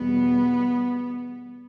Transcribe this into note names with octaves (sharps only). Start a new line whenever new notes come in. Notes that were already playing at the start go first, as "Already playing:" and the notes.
Already playing: E2 B2 G3 B3